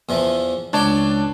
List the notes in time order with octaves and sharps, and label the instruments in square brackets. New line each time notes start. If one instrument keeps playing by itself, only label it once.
[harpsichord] E2 E3 F3
[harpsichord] C#2 D5 G5 [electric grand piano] D4 C#5 A5